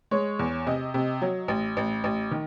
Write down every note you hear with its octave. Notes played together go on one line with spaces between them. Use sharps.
G#3 C#5
E2
C3 D#5
C3
F#3
A1
A1
A1
D#3